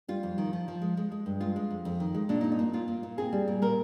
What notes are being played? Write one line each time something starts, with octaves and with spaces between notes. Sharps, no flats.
G3 F4
F2
D#3
F3
F3
G#3
G#3
G#3
G2
G#3 F4
G#3
F2
F2
D#3
G#3
A#2 D4
D#4
C4
D#4
A#2
A#2 F4
A#2
A#2
C4 G#4
G3
A#2
A#2 A#4